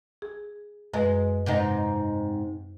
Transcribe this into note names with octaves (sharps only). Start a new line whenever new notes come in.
G#4
F#2 G#3 B4
G#2 C3 D#4